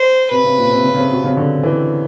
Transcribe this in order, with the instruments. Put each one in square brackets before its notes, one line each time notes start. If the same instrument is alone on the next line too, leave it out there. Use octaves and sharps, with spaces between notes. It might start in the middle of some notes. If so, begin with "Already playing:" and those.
Already playing: [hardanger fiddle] C5
[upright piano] C3 [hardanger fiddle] B4
[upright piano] C#3
A#2
C3
C#3
C#3
C3
B2
C#3
D3
E3